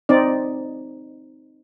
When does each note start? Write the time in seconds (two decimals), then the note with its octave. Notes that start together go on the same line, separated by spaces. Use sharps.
0.09 C4 D#4 D5